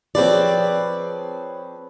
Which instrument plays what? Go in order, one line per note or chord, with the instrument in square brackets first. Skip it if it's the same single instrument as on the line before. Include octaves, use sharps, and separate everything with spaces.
[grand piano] F3 G#4 C#5 [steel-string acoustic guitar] C4 B4 D5